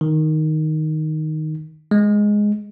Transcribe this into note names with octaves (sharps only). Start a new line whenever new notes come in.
D#3
G#3